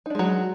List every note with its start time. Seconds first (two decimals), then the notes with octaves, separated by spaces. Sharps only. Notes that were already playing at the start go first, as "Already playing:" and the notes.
0.06 D#4
0.10 D4
0.15 G#3
0.19 F#3